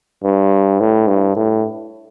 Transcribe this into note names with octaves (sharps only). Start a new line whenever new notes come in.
G2
A2
G2
A2